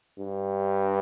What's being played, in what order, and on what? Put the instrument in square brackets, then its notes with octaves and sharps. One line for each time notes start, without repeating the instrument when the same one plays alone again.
[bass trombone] G2